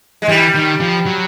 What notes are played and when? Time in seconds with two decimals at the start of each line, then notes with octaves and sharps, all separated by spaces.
0.22 G#3
0.28 E3 G3
0.55 D#3
0.80 F3
1.06 F#3